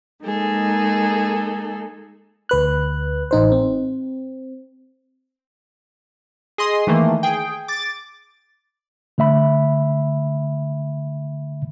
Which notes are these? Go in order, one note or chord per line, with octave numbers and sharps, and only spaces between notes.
G#3 A#3 D#4 G#4 A4
D2 B4 F#6
A1 D#4 C5
C4
G#4 D#5 C6 D#6
D#3 E3 A3 A#3
G#4 G5
D6 A6
D3 A3 E5 B5